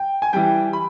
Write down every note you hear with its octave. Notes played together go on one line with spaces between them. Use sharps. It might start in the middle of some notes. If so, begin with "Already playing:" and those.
Already playing: G5
G#5
E3 G3 G5
B5